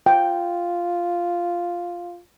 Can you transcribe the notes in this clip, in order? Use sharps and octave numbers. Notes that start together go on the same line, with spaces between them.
F4 G5